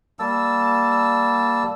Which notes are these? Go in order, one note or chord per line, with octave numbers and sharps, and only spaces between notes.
G3 A#3 A5 E6